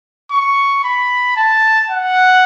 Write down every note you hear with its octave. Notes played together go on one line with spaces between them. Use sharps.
C#6
B5
A5
F#5